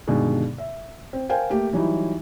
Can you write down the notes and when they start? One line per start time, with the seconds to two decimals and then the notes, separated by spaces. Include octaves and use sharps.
0.08 G2 B2 D3 D#3 G#3
0.58 E5
1.13 C4
1.29 A#4 C5 F5 G5 G#5
1.50 A3 A#3 G4
1.73 E3 F#3 G3 D#4 E4